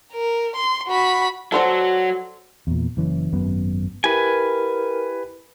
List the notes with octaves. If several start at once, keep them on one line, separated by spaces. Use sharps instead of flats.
A#4
C6
F#4 B5
F#3 F#4 A4 C5 D5
E2 A#2
F#1 E3 C#4
G#1 F#2 B3
E4 G4 A#4 B4 G#5